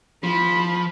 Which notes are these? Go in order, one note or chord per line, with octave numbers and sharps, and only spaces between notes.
F3 B5